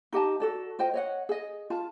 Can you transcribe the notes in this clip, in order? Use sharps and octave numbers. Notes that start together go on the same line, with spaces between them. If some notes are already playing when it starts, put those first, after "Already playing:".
D#4 G4 D#5 A5
F#4 A4 D5
F4 C5 D#5 G5
C#5 D#5 F#5
G#4 D#5
F4 F5 A5